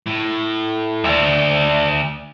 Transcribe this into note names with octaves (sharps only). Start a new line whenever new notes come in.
A2
D2 D5 E5